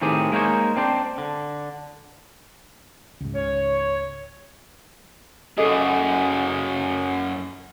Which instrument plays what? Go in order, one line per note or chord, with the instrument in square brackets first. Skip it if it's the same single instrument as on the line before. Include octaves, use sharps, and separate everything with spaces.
[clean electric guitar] A2 D#3 C4 G4 G#4
G#3 A#3 D#4 C5 C#5
C4 D4 C5
D3
[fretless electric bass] C#2 G#2
[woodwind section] C#5
[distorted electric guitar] F#2 G#4 [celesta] A4 D#5